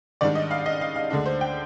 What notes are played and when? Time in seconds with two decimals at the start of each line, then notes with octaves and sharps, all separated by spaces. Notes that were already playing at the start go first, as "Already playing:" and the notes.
0.21 G#2 D#3 G3 D4 D5
0.35 D#5
0.51 F5
0.66 D#5
0.81 F5
0.96 F5
1.11 D2 D3 G#3 D4
1.26 C5
1.41 G5